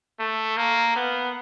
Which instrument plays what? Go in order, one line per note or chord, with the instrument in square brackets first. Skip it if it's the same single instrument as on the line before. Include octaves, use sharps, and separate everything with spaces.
[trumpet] A3
A#3
B3